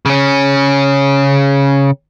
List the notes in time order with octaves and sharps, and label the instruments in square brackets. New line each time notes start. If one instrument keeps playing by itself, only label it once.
[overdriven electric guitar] C#3 C#4